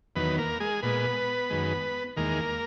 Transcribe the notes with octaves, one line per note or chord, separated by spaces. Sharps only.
E2 D#3 F#3 B3 B4
A#3 A#4
G#3 G#4
A#2 G#3 B3 B4
F#2 D#3 G#3
E2 D#3 G#3 A#3 A#4